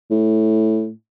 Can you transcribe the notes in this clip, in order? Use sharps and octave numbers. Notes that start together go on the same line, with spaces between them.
A2